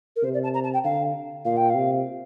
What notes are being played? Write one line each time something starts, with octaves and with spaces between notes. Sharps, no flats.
A#4
C3 C5
D5
A5
A#5
A5
G5
D3 F5
A#2 F5
G5
F5
C3